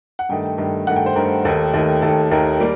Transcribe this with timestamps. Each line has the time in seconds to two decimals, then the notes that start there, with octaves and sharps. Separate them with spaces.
0.19 F#5
0.29 G2 D#3 A3 G5
0.58 G2 D#3 A3
0.87 G2 D#3 A3 F#5
0.96 G5
1.06 C5
1.16 G2 D#3 A3 A#4
1.45 D#2 D#3 A3 A4
1.74 D#2 D#3 A3
2.02 D#2 D#3 A3 A4
2.31 D#2 D#3 A3 A#4
2.60 G3 A#3